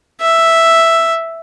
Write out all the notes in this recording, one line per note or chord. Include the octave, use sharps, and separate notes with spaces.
E5